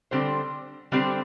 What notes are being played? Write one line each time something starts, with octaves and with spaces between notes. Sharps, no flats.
D3 G3 C4 G4 C5
D3 G3 C4 G4 C5